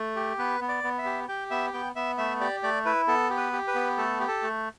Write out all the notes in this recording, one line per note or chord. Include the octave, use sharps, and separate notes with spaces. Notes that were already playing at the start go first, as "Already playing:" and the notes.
Already playing: A3
G4
B3 B4
B3
D5
B3
E5
G4
G4 G5
B3 E5
B3 G5
B3 E5
A3 E5
G4 D5
A3 D5
E4 B4
B3 A4
G4
B4
G4
B4
B3
A3 A4
G4
A4
A3